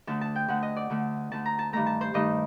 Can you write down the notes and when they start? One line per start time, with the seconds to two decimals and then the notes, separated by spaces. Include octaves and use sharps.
0.07 D2 D3 A3 A5
0.21 A5
0.35 G5
0.48 D2 D3 A3 F#5
0.63 D#5
0.76 D5
0.90 D2 D3 A3
1.31 D2 D3 A3 A5
1.45 A#5
1.59 A5
1.73 G2 D#3 A3 A#5
1.86 A5
2.01 C5
2.14 G2 D#3 A3 D#5